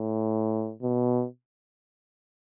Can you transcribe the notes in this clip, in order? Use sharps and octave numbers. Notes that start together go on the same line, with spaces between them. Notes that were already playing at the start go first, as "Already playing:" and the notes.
Already playing: A2
B2